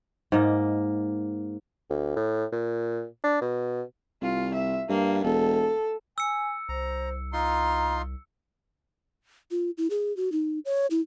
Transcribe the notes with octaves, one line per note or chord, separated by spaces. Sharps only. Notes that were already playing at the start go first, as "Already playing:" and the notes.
G#2 A#3 D#5
D2
A2
A#2
D4
B2
C2 F4
E5
G2 A#3
E1 A4
G#5 E6 C#7
C2 C5 A#5
D#4 F4 A#5 C6
F4
E4
G#4
F#4
D#4
C#5
E4